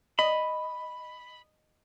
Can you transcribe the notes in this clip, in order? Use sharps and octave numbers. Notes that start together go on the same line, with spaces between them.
D#5 B5